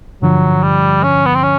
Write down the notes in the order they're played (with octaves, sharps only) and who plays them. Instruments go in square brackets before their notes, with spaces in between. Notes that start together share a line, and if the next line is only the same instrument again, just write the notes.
[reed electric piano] G2 D3 F3 [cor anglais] F#3
[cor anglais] G3
C#4
B3
C4
C#4